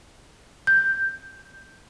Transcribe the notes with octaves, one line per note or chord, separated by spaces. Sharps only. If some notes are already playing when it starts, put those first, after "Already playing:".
G6